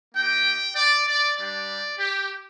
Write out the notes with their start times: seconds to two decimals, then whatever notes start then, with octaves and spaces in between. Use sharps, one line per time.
0.14 A#3 D#4 G4 G5
0.75 D5
1.07 D5
1.37 G3 D4 G4 D5
1.99 G4